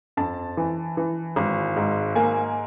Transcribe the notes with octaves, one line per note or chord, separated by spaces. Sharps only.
F2 A5
E3
E3
G#1
G#2
A#3 G#5